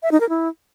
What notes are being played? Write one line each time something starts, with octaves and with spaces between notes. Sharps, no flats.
E5
D#4
A#4
E4